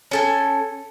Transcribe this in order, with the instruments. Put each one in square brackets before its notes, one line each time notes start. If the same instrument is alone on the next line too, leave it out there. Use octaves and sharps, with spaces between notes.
[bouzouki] C#4 A4 G#5